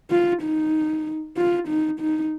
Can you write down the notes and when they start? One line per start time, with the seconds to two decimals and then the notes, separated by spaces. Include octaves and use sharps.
0.11 F4
0.43 D#4
1.37 F4
1.68 D#4
2.00 D#4